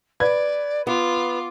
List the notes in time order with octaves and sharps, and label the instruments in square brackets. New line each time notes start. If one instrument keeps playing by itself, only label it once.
[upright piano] B4 G#6 [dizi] D5
[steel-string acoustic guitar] B3 [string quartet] F4 [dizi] D6